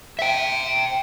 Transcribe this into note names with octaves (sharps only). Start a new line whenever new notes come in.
E5 G5